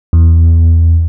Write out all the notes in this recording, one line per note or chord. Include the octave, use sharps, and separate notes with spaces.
E2